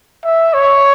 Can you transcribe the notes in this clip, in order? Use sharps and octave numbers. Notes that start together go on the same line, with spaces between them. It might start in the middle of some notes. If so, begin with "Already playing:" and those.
E5
C#5